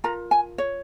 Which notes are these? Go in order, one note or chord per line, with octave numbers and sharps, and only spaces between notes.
F4 A#4 A#5
G#5
C#5